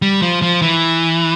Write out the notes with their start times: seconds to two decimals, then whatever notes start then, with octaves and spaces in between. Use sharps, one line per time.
0.02 G3
0.22 F3
0.42 F3
0.62 E3